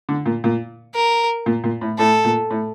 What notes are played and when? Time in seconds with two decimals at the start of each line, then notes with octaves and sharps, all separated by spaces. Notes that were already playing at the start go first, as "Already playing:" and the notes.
0.09 D3
0.26 A#2
0.44 A#2
0.95 A#4
1.46 A#2
1.64 A#2
1.81 A2
1.98 A2 A4
2.25 A#2
2.51 A2